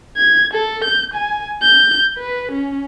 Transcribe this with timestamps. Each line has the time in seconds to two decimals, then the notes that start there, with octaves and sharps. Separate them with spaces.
0.17 G#6
0.54 A4
0.84 G6
1.14 G#5
1.62 G6
2.18 B4
2.52 C#4